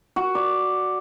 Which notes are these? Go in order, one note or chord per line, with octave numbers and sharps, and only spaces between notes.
F#4
D5